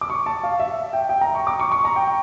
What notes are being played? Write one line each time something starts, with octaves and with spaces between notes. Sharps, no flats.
D6
C#6
A5
F5
E5
G5
G5
A#5
C#6
D6
C#6
C#6
A#5
G5